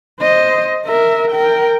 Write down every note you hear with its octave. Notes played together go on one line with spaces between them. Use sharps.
C5 D#5
A#4 E5
A#4 G5